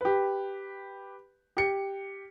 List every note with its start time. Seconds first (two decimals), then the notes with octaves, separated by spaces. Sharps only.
0.01 G4 B4
1.57 G4 C#7